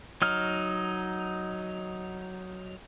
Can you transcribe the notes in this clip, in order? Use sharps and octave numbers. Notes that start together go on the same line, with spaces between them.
F#3 D#4 F6